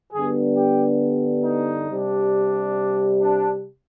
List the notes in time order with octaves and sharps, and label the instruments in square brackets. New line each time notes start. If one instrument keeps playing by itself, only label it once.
[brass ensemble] G2 D3 G3 B3 D4 G#4
G4
D#4
C3 G3 D4
D4